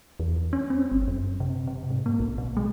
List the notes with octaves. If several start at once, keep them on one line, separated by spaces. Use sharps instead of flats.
E2
C#4
C4
G1
F#2
C3
C3
G#2
A#3
B1
B2
G#3